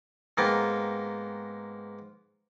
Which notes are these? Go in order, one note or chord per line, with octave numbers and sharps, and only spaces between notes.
G#2 A#3 B3 G5